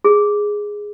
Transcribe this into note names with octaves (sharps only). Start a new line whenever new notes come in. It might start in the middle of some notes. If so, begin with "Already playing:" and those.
G#4